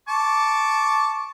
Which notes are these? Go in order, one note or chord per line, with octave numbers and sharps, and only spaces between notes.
A5 C#6 D6